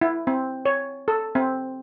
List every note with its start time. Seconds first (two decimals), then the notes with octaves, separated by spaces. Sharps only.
0.01 E4
0.27 C4
0.65 C#5
1.08 A4
1.35 C4